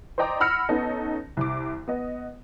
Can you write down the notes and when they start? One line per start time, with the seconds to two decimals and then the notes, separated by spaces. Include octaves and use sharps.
0.18 C5 D5 D#5 G5 A#5 D6
0.40 F#5 B5 E6 F6 A#6 C#7
0.69 B3 C#4 D#4 A4
1.37 C2 D6
1.88 B3 D#5